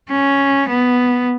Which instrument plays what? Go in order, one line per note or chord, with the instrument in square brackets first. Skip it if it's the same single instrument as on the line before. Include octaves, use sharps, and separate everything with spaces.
[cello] C#4
B3